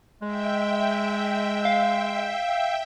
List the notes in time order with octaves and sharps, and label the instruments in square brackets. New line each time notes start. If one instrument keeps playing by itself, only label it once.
[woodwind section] G#3 [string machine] E5 G5
[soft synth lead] F5